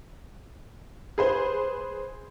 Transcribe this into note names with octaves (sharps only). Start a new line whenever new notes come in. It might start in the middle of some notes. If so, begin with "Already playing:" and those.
G#4 B4 C5